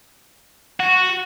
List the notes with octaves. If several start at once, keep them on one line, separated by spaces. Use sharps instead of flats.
F#4